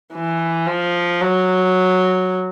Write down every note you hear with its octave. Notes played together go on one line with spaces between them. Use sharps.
E3
F3
F#3